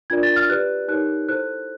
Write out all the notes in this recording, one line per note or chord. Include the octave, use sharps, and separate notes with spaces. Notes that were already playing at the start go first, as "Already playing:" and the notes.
D4 F4 A#4 D5 G#6
A6
F6
G4 B4 D5 F#6
D#4 G4 A#4 C#5 F#6
E4 A4 C5 F#6